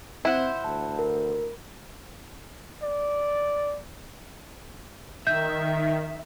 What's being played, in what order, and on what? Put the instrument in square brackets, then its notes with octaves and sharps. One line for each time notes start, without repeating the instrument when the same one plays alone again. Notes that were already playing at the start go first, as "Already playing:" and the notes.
[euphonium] C4 [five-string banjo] E4 [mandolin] C5 F#5
[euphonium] D2 [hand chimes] A5
[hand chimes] A#4
[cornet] D5
[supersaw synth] D#3 [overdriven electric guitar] E5 [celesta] G6